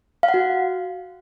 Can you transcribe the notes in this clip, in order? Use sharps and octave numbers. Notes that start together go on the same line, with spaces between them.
F5
F#5
F#4